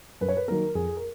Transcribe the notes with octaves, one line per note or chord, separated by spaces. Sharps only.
F#2 B4
C#5
B4
D#3 F#3 A#3 A#4
F2 G#4
A#4